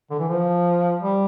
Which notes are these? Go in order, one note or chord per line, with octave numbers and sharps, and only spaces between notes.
D3
E3
F3
G3